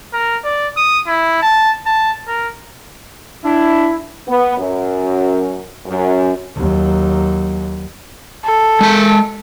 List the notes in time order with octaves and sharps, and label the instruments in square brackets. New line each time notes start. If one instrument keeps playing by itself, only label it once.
[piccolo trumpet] A#4
D5
D#6
E4
A5
A5
A#4
[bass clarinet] D4 [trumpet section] E4
[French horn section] B3
F#2
F#2
[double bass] D#2 F#3
[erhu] A4
[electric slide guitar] G#3 A5